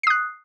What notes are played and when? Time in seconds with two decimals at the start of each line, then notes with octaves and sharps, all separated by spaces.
0.03 C7
0.07 D#6
0.10 F#6